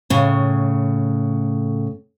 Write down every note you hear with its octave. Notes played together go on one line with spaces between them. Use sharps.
A2 C#3